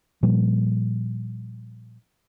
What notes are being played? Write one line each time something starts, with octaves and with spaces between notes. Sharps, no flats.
A#2 F3 G3